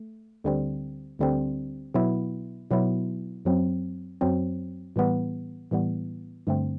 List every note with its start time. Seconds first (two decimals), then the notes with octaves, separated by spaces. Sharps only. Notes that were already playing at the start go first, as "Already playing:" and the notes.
Already playing: A3
0.44 D2 D3 G3 C4
1.19 D2 D3 G3 C4
1.94 B2 F#3 B3 E4
2.71 B2 F#3 B3 E4
3.45 F#2 F#3 C4
4.21 F#2 F#3 C4
4.96 A2 E3 G3 B3
5.71 A2 E3 G3 B3
6.47 G2 D3 A3 C4